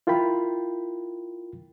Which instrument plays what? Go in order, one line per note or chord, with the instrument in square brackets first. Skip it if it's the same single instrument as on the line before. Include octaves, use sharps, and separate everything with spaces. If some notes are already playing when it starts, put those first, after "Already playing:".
[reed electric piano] E4 F4 A#4 G5 B5